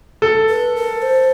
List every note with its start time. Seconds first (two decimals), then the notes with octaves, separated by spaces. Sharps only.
0.22 A4
0.49 B4
0.76 A#4
1.02 C5